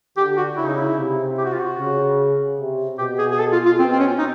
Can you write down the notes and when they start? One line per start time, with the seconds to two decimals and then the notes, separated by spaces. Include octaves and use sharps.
0.17 D3 G4
0.37 F#4
0.57 C#3 E4
0.67 D#4
0.78 E4
0.97 C3
1.38 G4
1.45 F#4
1.52 F4
1.60 F#4
1.78 C#3
2.58 C3
2.98 B2 G4
3.19 G#4
3.31 G#4
3.39 A4
3.53 F4
3.66 F4
3.79 B2 C4
3.92 C4
3.99 C#4
4.19 D#4